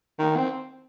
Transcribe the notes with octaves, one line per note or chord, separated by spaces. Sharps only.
D#3
C4